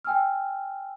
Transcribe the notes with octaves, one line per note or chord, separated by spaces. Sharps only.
G5 G#5 E6 F6